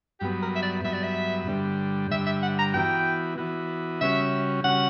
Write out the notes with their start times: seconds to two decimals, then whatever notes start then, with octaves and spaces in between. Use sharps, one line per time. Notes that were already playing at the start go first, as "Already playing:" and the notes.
0.20 G2 F#3 B3 G4
0.42 A#4
0.56 E5
0.63 D5
0.84 G2 F#3 B3 E5
0.93 D5
1.03 E5
1.48 G2 D3 G3
2.11 G2 D3 G3 E5
2.27 E5
2.43 F#5
2.59 A#5
2.74 E3 B3 F#4 G5
3.38 E3 B3 F#4
4.01 C#3 G3 C#4 F#4 E5
4.64 C#3 G3 C#4 F#4 F#5